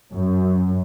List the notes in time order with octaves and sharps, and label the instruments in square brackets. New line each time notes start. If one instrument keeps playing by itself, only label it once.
[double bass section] F#2